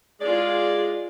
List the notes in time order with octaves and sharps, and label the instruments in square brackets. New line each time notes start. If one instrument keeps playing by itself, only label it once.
[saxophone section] G#3 D5 [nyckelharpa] F4 G#4